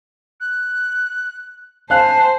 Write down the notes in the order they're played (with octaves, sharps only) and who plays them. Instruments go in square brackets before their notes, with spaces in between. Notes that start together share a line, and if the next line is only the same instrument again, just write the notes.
[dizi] F#6
[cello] C5 [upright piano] F5 F#6 [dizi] G#5 [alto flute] A5